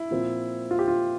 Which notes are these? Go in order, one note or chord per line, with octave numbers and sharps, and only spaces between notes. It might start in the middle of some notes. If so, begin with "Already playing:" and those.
Already playing: E4
A#2 F3 C4
F4
G4
F4